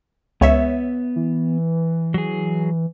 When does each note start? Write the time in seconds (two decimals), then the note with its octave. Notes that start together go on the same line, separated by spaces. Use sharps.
0.41 C#2 B3 C#5 E5
1.16 E3
2.14 F#3 G#4